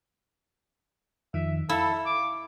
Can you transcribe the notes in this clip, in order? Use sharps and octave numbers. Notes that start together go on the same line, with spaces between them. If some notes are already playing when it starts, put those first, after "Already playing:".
F2 D#3 E5
E4 A4 F5
D6